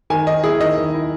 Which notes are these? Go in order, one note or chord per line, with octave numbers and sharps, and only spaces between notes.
D#3 G#5
D#3 D#5
E4 G#4
D#3 D#5
D#3
E4